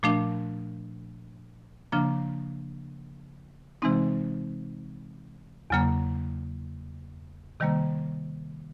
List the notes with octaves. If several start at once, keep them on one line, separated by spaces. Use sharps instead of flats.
A#2 F3 A3 D4
C#3 F3 A#3 D4
C3 E3 G#3 C4 D#4
E2 C#3 F#3 A#3
C3 D#3 G3 A#3